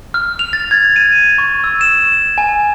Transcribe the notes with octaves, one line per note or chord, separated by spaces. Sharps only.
F6
F7
A6
G#6
D#7
C#6
E6
E7
G#5